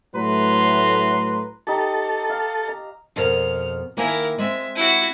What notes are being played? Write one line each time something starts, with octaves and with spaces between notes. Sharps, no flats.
A2 F#3 A3 B4 A#5 C6
D#4 G4 A4
F5
A#5
F2 B2 A#4 F6
D#3 A#3 E4 A#4 G#5
G#3 C4 E5
E4 F#4